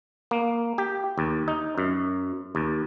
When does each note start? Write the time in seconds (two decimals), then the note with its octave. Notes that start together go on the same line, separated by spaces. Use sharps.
0.31 A#3
0.78 G4
1.18 D#2
1.48 D#4
1.78 F#2
2.55 D#2